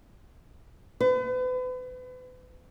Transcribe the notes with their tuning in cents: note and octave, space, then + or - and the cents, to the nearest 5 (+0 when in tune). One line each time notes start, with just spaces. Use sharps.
B4 +40